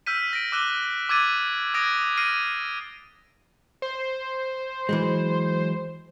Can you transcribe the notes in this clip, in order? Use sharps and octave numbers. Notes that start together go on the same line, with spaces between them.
E6 F6 G6 B6 D#7
A#6 D7
D6 E6 F#6 D#7 E7 G7
D6 E6 F#6 G#6 A6 D#7
D#6 E6 F#6 G#6 A#6 D7
F6 A#6 C7 D7 D#7
C5
E3 F#3 G#3